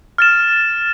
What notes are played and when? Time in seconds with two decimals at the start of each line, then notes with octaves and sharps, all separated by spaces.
0.18 F6 A6 E7